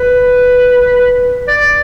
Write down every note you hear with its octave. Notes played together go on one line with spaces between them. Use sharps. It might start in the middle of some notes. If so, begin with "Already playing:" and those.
Already playing: B4
D5